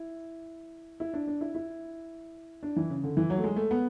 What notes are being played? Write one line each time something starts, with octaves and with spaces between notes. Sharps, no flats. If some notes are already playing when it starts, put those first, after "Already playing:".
Already playing: E4
E4
D4
D4
E4
E4
D4
E3
C#3
D3
E3
F#3
A3
G#3
A3
B3